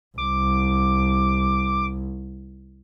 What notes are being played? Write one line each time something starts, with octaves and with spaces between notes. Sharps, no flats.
C2 D6